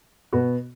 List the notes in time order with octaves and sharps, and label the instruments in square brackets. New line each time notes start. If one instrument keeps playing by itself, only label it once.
[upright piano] B2 B3 F#4